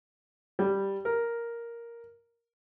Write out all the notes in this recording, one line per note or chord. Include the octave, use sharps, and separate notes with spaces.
G3
A#4